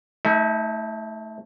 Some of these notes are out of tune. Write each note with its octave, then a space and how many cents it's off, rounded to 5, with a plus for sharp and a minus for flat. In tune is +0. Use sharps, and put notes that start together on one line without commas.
A3 +0 D#4 +45